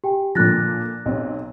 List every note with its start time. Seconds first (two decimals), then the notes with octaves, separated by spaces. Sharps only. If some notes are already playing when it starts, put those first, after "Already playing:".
0.04 G4 G5 G#5
0.35 A#2 D3 F3 F#6 A6 A#6
1.06 B1 C4